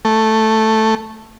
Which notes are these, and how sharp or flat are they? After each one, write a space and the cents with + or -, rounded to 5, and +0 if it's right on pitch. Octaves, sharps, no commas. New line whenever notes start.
A3 +0